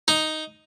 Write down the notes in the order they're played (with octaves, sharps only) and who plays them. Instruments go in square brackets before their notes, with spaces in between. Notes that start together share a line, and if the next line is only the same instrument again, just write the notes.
[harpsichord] D#4